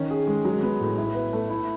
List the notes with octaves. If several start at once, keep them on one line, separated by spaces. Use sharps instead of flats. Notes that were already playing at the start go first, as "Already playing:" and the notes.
Already playing: D#3 C#4
G#4
G#3
F#3
B3
A2
E4
B4
A3
E4